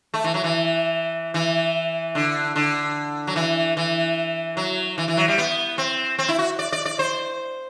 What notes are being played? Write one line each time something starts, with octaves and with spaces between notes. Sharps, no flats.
A3
E3
F#3
E3
E3
D3
D3
F#3
E3
E3
F#3
E3
E3
F#3
G3
B3
C4
C4
E4
F#4
D5
D5
D5
C5